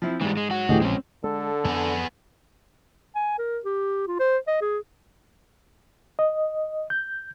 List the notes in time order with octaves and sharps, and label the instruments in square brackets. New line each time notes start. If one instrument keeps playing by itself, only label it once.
[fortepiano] F3 C4 E4
[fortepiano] G#2 [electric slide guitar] E3 G3
[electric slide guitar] G#3
F#3 F#4
[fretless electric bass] D2 A2 E3 [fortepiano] G4 G#4 D#5
[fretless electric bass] A#1 [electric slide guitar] G#3 C#4 [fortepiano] C4
[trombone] D3 [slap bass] G#3 [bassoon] A4
[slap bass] F2 [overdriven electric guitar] B3 G#4
[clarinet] G#5
A#4
G4
F4
C5
D#5
G#4
[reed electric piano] D#5
G6